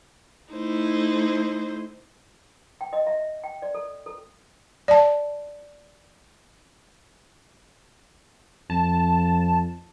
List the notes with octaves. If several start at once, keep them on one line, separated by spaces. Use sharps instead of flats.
A3 D#4 E4 C5
G5
D#5
E5
G5
D5
A4
A4
D5 A5
F2 A5